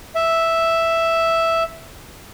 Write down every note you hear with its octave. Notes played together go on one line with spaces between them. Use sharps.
E5